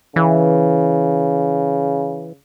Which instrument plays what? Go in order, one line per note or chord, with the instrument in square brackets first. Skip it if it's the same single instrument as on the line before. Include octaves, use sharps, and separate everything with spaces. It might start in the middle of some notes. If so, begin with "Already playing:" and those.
[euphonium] C#3 [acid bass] E3